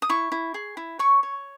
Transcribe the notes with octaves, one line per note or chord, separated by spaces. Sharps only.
D#6
E4 C#6
E4
G#4
E4
C#5 C#6
C#5